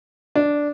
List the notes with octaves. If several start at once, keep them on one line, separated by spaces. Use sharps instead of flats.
D4